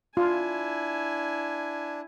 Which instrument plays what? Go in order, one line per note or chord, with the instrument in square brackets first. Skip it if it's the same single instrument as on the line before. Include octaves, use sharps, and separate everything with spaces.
[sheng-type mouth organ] D4 [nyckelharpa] E4 G#5 [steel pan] F4